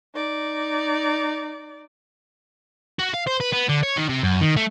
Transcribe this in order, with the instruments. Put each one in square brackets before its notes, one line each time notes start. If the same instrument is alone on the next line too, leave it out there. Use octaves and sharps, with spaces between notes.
[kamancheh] D#4 D5
[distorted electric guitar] F#4
F5
C5
B4
B3
D3
C#5
D#3
C3
F#2
D#3
A3